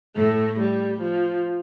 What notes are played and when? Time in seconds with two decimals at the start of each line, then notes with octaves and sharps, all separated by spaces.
0.16 A2 A3
0.59 G3
1.01 F3